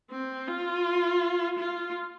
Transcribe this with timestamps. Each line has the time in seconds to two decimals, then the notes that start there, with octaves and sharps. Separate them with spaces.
0.11 C4
0.47 F4
1.59 F4